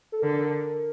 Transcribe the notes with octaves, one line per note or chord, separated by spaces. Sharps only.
A4
D3 A#4